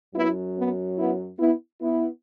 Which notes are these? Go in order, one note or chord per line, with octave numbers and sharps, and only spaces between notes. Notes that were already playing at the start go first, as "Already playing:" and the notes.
F#2 F#3 B3 E4
B3
B3 E4
B3 E4
B3 E4